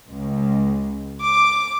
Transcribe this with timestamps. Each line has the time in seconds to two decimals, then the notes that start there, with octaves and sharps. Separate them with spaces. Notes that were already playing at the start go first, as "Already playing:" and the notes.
0.11 C#2
1.23 D6